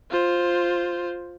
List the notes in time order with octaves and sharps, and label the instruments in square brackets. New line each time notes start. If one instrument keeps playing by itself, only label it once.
[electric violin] F4 C5